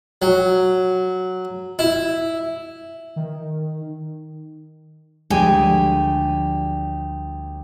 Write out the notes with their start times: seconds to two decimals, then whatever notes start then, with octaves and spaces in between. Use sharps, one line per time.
0.22 F#3
1.79 E4
3.16 D#3
5.30 D2 F3 G3 G#3 G4 G#5